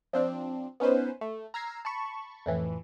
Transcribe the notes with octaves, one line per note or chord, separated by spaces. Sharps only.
F3 C4 D4
B3 C#4 D#4 B4 C5
A3
A#5 E6 F6 G#6 A#6 C7
A5 B5 C#6
F2 A2 E3